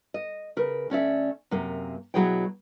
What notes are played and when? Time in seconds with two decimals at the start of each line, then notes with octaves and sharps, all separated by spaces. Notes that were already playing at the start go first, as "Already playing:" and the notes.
0.14 D#5
0.57 C#3 A#4 B4
0.90 D2 C#4 D5 E5
1.51 F#2 C3 A#3
2.14 B2 F#3 E4 G#4 C#5 G5